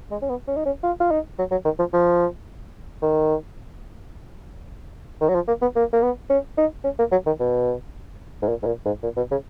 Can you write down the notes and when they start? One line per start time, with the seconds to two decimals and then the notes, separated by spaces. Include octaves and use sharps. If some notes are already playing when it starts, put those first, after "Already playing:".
0.11 G#3
0.22 C#4
0.30 B3
0.48 C#4
0.57 D#4
0.66 C#4
0.83 F4
1.00 F4
1.11 D#4
1.39 F#3
1.51 F#3
1.65 D#3
1.79 F3
1.93 F3
3.02 D#3
5.21 D#3
5.29 F#3
5.35 F3
5.48 A#3
5.62 B3
5.76 A#3
5.93 A#3
6.03 B3
6.30 C#4
6.58 D#4
6.84 C#4
6.99 A#3
7.12 F#3
7.27 D#3
7.40 B2
8.42 G#2
8.49 A#2
8.63 G#2
8.67 A#2
8.86 G#2
9.03 A#2
9.17 B2
9.31 C#3